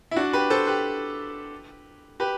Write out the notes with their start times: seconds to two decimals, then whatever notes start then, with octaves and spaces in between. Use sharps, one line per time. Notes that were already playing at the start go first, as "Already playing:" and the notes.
0.11 E4
0.16 D4 F#4
0.33 G4 B4
0.50 A4 C5
0.67 G4 B4
2.20 G4 B4